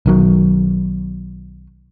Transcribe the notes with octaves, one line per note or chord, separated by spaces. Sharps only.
B1 D#3 F#3